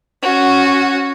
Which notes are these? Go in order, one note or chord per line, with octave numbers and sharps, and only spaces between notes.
C#4 F#4